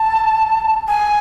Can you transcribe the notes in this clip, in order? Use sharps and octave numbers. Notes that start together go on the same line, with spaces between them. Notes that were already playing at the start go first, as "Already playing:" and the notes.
Already playing: A5
G#5